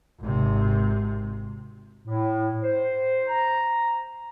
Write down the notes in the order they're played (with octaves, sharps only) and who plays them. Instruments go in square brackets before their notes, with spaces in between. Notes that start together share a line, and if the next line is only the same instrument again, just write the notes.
[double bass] G#1 C3
[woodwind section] A2
C5
A#5